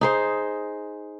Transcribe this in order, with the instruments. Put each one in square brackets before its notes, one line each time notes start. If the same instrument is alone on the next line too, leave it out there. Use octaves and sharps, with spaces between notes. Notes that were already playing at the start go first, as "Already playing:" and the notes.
[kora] D#4 G#4 C5